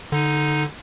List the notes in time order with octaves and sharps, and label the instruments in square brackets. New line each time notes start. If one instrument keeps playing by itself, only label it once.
[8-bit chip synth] D3 [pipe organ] D#4